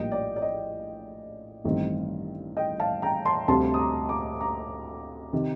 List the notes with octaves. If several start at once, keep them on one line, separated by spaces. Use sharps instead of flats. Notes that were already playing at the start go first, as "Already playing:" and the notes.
Already playing: A#1 A2 G3 A#3 D#5 G5
D5
D5
D#5
A1 G2 D#3 A3 C4
D#5 G5
F5 A5
G5 A#5
A5 C6
D2 C3 G3 C4 A5 C6
D#6
A#5 D6
A#5 D6
A#5 D6
C3 D#3